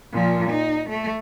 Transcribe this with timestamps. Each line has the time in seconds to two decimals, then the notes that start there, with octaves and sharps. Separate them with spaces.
0.12 A#2 F3
0.49 D#4
0.89 A3